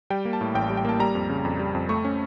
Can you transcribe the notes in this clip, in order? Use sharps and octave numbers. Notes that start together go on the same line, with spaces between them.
G3 G5
A#3
A5
A2
A1 G5
G3
G5
A#3 A5
G3 A#5
F2
C#3
F2
G3
F2
A3 C#6
C#4